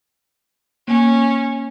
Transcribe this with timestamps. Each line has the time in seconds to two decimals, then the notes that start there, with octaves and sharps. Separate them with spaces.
0.88 A#3 C#4 G#5